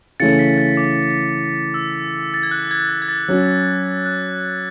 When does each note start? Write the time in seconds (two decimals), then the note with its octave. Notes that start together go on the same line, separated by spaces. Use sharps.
0.20 C#3 E3 A3 C#4 A6 C#7
0.39 B6
0.58 A6
0.77 D6
1.74 E6
2.34 A6
2.43 G#6
2.51 F#6
2.71 G#6
2.89 A6
3.02 G#6
3.08 A6
3.28 F#3 C#4 F#4
4.06 F#6